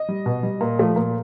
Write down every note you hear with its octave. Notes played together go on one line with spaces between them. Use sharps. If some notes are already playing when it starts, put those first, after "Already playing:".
Already playing: D#5
G3
B2
G3
A#2
F3 A3
A#2